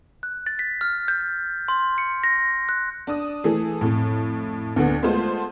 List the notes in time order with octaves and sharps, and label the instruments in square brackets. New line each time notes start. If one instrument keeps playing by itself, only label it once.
[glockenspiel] F#6
A6
B6
F6
G6
C6
C#7
A#6
F#6
[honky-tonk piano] D4 D#6
E3 A3 G#4
F2 A2
D2 D3 B3
G#3 A3 B3 F4 C5